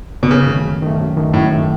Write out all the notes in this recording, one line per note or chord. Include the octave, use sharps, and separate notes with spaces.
B2
F#2 C#3
D#3 A3
F#2
D#3 A3
F#2
D#3 A3
F#2 A2
D#3 A3